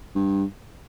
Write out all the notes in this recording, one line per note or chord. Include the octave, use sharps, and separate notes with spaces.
G2